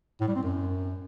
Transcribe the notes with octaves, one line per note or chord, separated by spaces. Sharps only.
A2
G3
C4
F#2